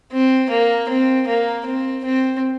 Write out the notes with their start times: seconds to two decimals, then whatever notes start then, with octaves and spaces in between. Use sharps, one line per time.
0.12 C4
0.50 A#3
0.89 C4
1.27 A#3
1.66 C4
2.04 C4